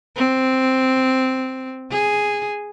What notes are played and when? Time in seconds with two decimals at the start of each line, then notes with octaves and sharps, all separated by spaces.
0.16 C4
1.91 G#4